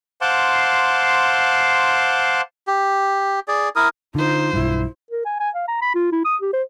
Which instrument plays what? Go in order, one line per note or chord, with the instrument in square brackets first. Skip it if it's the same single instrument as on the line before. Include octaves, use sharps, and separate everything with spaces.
[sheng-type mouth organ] C5 F5 F#5 A5 C6 D6
[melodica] G4
G#4 D5
E4 A#4 D#6
[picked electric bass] D3 [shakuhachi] D#4 [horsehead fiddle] F4 C5
[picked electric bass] B1 G2 [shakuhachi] E4
[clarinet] A#4
G#5
G#5
F5
A#5
B5
F4
E4
D#6
G4
C5